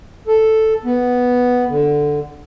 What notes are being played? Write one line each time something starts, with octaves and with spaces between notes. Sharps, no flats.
A4
B3
D3